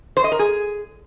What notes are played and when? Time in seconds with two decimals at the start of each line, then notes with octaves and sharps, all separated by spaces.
0.17 C5
0.24 D#5
0.32 A#4
0.39 G#4